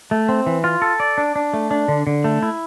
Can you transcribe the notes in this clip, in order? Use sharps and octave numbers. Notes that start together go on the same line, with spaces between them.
A3
C4
E3
F4
A4
D5
D4
D4
A3
D4
D3
D3
A3
E4